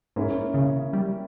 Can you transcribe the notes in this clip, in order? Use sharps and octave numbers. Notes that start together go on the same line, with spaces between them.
G#2 A#3 C#4 E4
C#3
G3